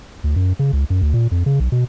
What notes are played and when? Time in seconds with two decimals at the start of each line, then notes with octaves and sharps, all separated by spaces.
0.24 D2
0.36 F#2
0.59 C#3
0.73 C#2
0.90 F#2
1.02 D2
1.14 A#2
1.31 F2
1.46 C#3
1.60 B1
1.72 B2